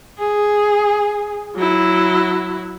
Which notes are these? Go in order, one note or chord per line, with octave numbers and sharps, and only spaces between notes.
G#4
F#3 E4